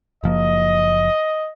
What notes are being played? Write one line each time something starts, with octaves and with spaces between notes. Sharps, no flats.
F#1 F3 A#3 D#5